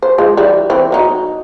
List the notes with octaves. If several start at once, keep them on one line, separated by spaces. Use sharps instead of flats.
C5
F3 G#3
E3 G3
E3 C4
F#3 D#4